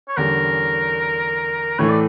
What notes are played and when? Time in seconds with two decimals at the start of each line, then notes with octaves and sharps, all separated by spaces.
0.08 C#5
0.17 E2 D3 G3 C#4 A#4
1.79 A2 E3 A3 C#5
1.89 D5